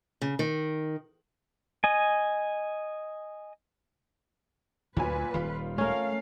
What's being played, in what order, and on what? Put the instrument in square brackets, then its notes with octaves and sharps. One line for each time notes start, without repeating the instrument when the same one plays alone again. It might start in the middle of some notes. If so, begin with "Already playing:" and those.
[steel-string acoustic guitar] C#3
D#3
[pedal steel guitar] D#5 G#5
[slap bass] D2 [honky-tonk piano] A#2 F#3 G#5 [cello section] B4
[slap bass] D#1 D#3 G3 [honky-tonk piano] F4
[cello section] A3 F5 [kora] C#4 A#4